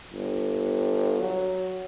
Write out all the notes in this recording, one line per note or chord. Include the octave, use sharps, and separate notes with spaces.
G1
F#3